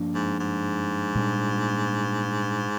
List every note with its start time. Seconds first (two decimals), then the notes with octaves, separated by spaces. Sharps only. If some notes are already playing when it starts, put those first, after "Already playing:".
Already playing: G2 F3 A#3 D4
0.14 G#2
0.40 G#2
1.15 A#2 G3 D4